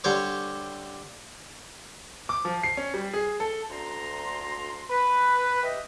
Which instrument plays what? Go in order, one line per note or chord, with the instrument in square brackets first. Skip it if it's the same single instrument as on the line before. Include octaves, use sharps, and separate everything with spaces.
[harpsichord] D3 G3 C5 C#5 D6
[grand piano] D6
F3
C7
C#4
G3
G#4
A4
[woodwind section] D2 A#5 C6
B4
G4 D#5 E5